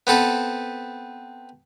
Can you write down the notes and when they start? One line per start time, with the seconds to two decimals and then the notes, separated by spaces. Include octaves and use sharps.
0.07 B3 C4 A4 B4